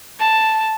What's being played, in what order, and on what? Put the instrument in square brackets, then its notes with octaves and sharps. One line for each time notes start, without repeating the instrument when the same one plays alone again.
[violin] A5